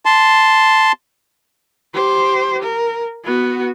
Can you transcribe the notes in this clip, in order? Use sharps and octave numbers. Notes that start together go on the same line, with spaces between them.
A5 C6
G4 C5
A#4
B3 F#4